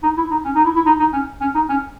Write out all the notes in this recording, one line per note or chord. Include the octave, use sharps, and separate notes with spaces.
D#4
E4
D#4
C#4
D#4
E4
E4
D#4
D#4
C#4
C#4
D#4
C#4